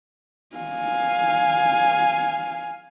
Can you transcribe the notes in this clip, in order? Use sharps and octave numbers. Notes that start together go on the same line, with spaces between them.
F5 G#5